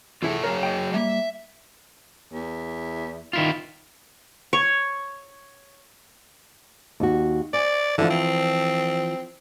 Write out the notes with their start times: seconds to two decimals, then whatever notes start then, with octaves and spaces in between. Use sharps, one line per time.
0.23 E2 E4 F4 G#4 A4 E5
0.44 F#3 G#4 A#4 C#5
0.63 D#5 G5
0.94 G3 A#3 E5
2.33 E2
3.33 D#3 E4 F4
4.53 C#5
7.00 D#2 F#4
7.53 D5 G#5
7.98 D3 E3 F3 F4
8.10 C4